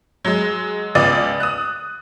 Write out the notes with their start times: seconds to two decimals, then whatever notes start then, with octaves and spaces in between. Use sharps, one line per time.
0.25 F#3 G#3
0.95 C#2 B3 F4 D5 D#6 A6
1.40 D#6 F#6